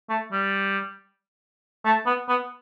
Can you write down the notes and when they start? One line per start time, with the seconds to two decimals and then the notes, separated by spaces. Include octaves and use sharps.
0.10 A3
0.32 G3
1.85 A3
2.06 B3
2.29 B3